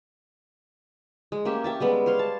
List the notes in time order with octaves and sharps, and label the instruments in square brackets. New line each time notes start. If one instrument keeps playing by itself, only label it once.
[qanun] G#3
A#3 C#4 G4 E5
G4 E5 A5
G3 G#3 B3
C5 C#5 F5 C6
A5